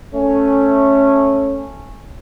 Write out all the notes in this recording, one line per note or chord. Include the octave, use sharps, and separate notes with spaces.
A3 C#4